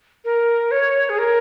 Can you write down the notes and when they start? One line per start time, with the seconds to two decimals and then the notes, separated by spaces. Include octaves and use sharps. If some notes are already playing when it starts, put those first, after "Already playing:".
0.25 A#4
0.71 C#5
1.09 G#4
1.19 A#4